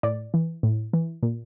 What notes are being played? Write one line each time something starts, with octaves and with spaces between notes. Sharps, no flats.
A2 D5
E3
A2
E3
A#2